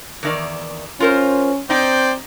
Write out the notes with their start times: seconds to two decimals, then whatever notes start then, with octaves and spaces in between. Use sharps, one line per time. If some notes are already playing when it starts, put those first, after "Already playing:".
0.23 E2 D#3 D5
1.00 C#4 F4 A#4 C5
1.70 C4 D#4 C5 D5 G5